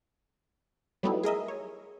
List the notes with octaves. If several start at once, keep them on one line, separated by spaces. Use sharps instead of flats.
F#3 G3 A3 B3 D#4 E4
G#4 A#4 D#5 E5
C#5